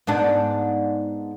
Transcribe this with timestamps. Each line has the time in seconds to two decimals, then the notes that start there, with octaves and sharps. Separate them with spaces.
0.07 G#2 B3 D4